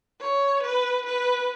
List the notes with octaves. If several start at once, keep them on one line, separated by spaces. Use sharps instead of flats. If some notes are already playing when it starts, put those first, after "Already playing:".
C#5
B4
B4